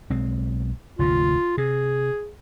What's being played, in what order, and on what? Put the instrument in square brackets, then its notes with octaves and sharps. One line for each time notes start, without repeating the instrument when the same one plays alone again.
[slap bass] B1 G#3 C4
[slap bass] F1 D2 A#2 [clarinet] F4
[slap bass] C3 [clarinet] G#4